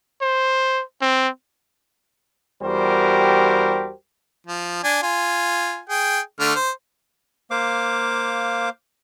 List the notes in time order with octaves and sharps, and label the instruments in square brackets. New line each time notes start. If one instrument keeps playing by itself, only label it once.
[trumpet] C5
C4
[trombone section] E2 G3 F#4 G4 A#4 C5
[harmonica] F3
D4 G#5
F4 G#5
G#4 G5
D3 A3 F6
C5
[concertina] A#3 C5 F5 D6